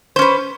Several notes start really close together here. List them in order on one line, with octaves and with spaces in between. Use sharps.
C5 C#4 B4